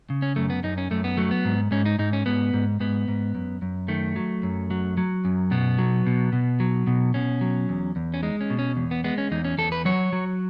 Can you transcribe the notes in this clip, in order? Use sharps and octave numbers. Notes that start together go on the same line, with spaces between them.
C#3
C#4
F#2 A3
B3
F#2 D#4
C#4
F#2 A3
B3
F#3 A3
B3
G#2
G#2 C#4
D#4
G#2 D#4
C#4
G#2 B3
G#2
G#2 B3
G#2
F#2
F#2
D#3 A3
F#3
F#2
F#3
F#3
F#2
B2 B3
F#3
B2
B2
F#3
B2
B2 C#4
F#3
E2
E2
C#4
G#3 D#4
C#4
B2
C#4
E2
B3
G#3 B3
C#4
E2 D#4
C#4
E2 A4
B4
F#3 C#5
F#3